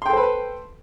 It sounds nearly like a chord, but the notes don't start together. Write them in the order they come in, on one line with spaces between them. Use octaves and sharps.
C6 G5 A4 C5 B4